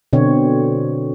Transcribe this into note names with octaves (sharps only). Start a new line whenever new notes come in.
B2 D3 C4 C#5